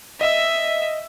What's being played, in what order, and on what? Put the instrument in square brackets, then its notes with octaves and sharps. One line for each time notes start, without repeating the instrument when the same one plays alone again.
[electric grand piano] D#5 E6 [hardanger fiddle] E5